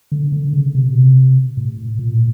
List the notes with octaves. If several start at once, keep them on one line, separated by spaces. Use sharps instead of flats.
D3
D3
C#3
C3
B2
C3
A2
A#2
A2